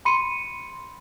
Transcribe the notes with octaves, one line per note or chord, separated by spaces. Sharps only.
B5 C6 C#7 D#7